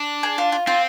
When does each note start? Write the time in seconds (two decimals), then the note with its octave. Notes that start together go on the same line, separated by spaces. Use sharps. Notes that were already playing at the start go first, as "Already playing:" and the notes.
Already playing: D4
0.23 G#4
0.38 F4
0.52 F4
0.67 C4 F4